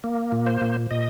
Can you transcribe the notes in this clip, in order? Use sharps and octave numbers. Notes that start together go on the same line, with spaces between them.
A#3
A#2
C5
A#2
A#2 D#5